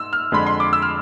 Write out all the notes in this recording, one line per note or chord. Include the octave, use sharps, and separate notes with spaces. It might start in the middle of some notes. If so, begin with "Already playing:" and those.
Already playing: G#2 E6
F6
F2 D3 G#3 B5
C6
D6
E6
F6